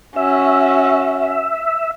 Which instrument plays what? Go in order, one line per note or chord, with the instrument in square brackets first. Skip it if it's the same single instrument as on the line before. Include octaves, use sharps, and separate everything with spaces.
[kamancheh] C#4 F#4 [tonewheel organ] E5